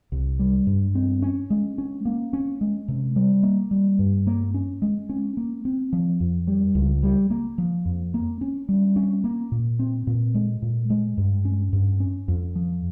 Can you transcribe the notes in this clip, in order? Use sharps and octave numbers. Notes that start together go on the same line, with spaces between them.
C2
G3
G2
C4
C#4
G#3
C#4
A#3
C#4
G#3
C3
G3
A#3
G3
G2
A#3
C#4
G#3
C#4
A#3
C4
F3
F2
G3
C#2
G3
A#3
F3
F2
A#3
C#4
G3
C#4
A#3
A#2
C4
A#2
G#3
A#2
G#3
G2
C#4
G2
C#4
F2
F3